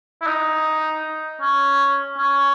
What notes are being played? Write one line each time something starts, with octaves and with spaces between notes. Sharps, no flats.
E4
D#4
C#4
C#4